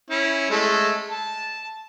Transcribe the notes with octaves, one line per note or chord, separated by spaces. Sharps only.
C#4 E4
G#3 A3 A4
A5